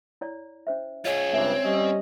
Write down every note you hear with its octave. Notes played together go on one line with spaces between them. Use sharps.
E4 C#5 D5
C#4 C5 E5
F4 G#4 C#5 D#5
C#2 G2 C4 A4 E5 G#5
G3 C#4 D#5